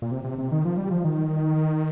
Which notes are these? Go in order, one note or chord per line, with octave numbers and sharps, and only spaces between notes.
A#2
C3
C3
C3
D#3
F3
G3
F3
D#3